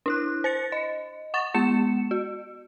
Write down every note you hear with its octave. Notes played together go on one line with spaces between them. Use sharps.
D4 E4 F#6
C5 A6 C#7
D#5
F#5 C#6 A6
G#3 B3 C#7 E7
F#4